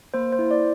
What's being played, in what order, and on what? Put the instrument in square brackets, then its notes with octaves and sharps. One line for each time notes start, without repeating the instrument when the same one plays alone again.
[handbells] A#3 C5
C5
E4
D5